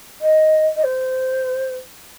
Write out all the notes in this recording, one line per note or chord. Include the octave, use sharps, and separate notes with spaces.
D#5
D#5
C5